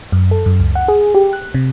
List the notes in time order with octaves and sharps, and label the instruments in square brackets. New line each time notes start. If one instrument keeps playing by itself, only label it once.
[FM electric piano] F#2
A4
F#2
C#2
F#5
G#4
G4
F#6
C3